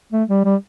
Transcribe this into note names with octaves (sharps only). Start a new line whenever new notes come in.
A3
G3
G3